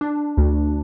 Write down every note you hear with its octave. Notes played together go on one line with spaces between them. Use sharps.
D4
D2